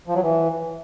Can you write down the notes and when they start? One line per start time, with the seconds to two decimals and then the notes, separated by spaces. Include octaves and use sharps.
0.08 F3
0.15 F#3
0.23 E3